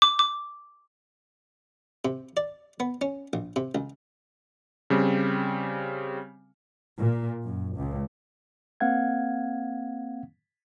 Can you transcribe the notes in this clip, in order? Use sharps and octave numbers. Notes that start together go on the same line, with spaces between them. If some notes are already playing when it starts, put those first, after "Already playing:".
D6
D6
C3
D5
B3
C#4
A#1
C3
C#2
C#3 G3 C4
A#2
F#2
C#2
A#3 C4 F5 F#5 G#6